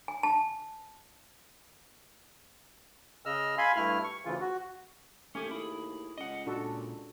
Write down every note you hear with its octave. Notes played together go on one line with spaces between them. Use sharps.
G#5
A5
C#3 D#5 E6 F6
F5 G#5 B5 C6
G2 A3 E4 F6
C#6
D2 C#3 E3 F4
F#4
D#2 A3 C#4 G4 G#5
E4 G#4
C#2 D#5 F#5
A#2 D4 F#4 A4